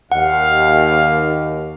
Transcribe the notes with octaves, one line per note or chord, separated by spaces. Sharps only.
D#2 F5 F#5